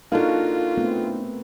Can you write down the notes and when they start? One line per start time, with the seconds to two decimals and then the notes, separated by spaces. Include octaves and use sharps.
0.12 A#3 D4 D#4 F4 F#4 A4 A#4 F5
0.77 A3 B3 C4